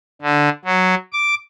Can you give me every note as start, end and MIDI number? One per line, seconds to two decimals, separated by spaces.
0.22 0.49 50
0.65 0.95 54
1.13 1.34 86